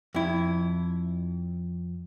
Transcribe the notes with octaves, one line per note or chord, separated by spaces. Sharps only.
F2 E4